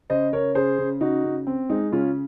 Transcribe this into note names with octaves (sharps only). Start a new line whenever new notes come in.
C#3 C5 D#5
C#3 A#4 C#5
C#3 G#4 C5
C#3
C#3 D#4 F#4
C#3
C4
G#3 D#4
C#3 C#4 F4